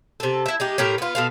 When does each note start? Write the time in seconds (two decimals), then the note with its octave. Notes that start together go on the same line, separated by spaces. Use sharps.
0.20 C3 A4
0.46 E4 E5
0.60 G#3 D#4 G4
0.78 A2 G4 A#4
0.98 B3 F4
1.15 B2 A4 F5